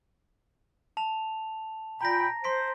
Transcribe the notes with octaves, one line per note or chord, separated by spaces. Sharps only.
A5 F7
A#2 G5 A#5 B5 A#6
C5 C6 B6 D7